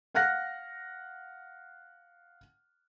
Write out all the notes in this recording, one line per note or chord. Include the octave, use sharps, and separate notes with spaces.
F5 F#5 F6 F#6 A#6